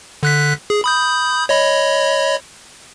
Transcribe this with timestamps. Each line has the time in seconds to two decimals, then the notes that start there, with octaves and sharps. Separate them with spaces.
0.23 D3 F#6 B6
0.70 G#4
0.84 B5 D#6 G6
1.49 C#5 D#5 B5